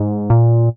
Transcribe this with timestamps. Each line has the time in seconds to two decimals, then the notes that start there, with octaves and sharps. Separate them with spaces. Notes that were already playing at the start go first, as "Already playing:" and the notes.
Already playing: G#2
0.30 A#2